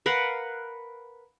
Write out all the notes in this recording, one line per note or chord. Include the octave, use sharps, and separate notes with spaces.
A#4 B4 F5 F#5